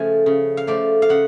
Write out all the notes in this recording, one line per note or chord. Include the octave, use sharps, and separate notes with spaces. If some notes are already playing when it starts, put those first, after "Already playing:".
Already playing: C#3 F3 A3 G#5
C#3
F5
F3 A3 D5
F5
C#3 F#5